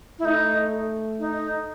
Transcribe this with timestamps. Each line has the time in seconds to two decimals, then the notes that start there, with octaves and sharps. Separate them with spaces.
0.19 E4
0.24 A3 D#4
1.19 D#4